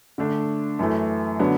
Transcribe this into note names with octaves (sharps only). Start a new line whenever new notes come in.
D3 A3 D4
F#2 E3 A3
D3 F#3 B3 D4